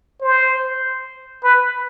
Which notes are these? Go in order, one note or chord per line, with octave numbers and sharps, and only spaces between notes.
C5
B4